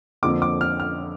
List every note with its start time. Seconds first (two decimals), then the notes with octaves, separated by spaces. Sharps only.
0.23 F2 D3 F3 A#3 D6
0.42 D6
0.61 F6
0.80 F6